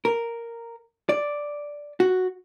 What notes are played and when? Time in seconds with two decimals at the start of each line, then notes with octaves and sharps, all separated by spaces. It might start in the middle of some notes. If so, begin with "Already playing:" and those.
0.05 A#4
1.09 D5
2.00 F#4